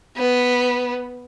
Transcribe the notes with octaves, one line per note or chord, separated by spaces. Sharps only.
B3